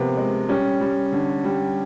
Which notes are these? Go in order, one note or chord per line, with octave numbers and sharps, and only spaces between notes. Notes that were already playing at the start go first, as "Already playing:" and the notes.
Already playing: C3 F3 A#3 B3
G#3
G3 C#4
G3
D3
G3